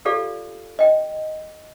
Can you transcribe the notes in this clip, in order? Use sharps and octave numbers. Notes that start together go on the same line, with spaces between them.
F4 G4 A4 D5 F5
D#5 G5